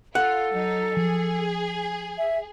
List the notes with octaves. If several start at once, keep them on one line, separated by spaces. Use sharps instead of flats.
F4 A4 F#5
F#3 D#4
F3 G#4
E5